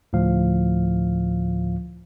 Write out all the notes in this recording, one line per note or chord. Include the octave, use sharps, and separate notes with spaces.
D2 A2 F3 F5